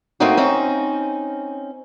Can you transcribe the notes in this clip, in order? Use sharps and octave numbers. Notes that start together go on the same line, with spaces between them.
A3 A#3 C4 C#4 D#4 F#4
C4 C#4 D#4